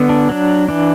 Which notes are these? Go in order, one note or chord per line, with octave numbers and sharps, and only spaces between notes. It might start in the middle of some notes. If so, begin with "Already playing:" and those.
Already playing: D3 B3
D4
F#3 D4
E3 D4